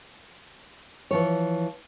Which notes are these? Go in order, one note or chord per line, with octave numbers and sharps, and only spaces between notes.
E3 F3 C#5